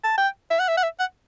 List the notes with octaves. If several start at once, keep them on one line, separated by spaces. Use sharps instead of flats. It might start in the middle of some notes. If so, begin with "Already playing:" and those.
A5
G5
E5
F#5
E5
F#5
E5
F#5